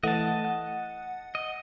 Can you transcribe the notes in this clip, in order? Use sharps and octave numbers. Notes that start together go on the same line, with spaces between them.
E3 A3 D#5 F#5 A5
F#5
D#5